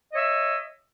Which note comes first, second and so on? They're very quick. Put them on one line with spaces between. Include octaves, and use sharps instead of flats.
D#5 C#5 E5